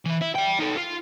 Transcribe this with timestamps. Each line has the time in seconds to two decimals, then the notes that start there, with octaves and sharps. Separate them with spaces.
0.06 E3 E4
0.22 E4
0.36 D5 G5
0.60 D#4 A4
0.77 F4